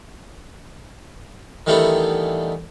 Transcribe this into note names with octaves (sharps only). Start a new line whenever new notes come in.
D#3 E3 G3 A3 B3 D4